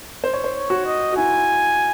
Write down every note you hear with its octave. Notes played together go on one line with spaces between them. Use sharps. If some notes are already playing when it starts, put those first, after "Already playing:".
C5
C#5
C5
C#5
F#4
D#5
F#4
E4 G#5